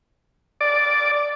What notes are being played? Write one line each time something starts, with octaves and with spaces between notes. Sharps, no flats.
D5